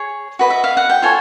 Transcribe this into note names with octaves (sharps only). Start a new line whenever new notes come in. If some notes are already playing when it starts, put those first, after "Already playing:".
Already playing: G#4 C#5
F#4 B4 D#5
E5
F5
F#5
G5
F4 A4 C#5 G#5